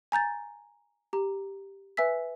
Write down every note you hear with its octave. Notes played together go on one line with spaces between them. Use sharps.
G#5 A#5 G6 A6
G4 A#5
B4 E5 G#5 E6 B6